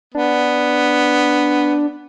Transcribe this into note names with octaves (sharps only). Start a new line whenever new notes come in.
B3 D4